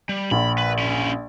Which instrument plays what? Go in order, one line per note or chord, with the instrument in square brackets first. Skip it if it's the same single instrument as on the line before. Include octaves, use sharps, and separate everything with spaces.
[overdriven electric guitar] G3
[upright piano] A#1 [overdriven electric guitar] B5
[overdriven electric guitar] B4
C#4 E4